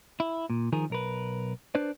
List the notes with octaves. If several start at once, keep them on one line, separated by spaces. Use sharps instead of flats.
E4
A#2
D#3 F3 G#4 A#4
B1 A#4 B4
D4 B4 C5 D5